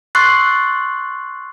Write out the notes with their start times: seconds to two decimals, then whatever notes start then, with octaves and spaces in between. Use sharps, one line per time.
0.15 C6 C#6 E6 F#6 A6 C7